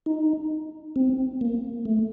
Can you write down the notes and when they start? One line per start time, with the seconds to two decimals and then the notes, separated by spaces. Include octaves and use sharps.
0.06 D#4
0.96 C4
1.41 A#3
1.85 A3